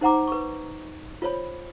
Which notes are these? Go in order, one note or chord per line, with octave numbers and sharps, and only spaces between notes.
D#4 C5 F#5 A#5 D6
B4 C#6
F4 C5 C#5 B5